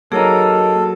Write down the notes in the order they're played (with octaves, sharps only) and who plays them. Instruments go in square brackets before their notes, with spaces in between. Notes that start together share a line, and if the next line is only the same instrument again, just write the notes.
[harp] F#3 [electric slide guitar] A#3 D#4 [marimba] G#4 C#5 A#5 [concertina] A4